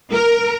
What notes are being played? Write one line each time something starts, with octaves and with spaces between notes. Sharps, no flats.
A#4